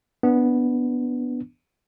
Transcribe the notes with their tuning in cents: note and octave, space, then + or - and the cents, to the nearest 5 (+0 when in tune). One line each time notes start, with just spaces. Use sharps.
B3 +0 D4 +0